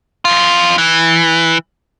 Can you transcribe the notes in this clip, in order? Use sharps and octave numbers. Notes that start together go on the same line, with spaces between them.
F2 F4
E3